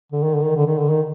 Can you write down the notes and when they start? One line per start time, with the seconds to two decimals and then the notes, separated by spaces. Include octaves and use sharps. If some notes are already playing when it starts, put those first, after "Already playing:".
0.12 D3
0.23 D#3
0.34 D3
0.45 D#3
0.57 D3
0.67 D#3
0.79 D3
0.90 D#3